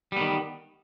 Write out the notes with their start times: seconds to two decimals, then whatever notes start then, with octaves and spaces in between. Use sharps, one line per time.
0.12 G3
0.16 B3
0.21 D#3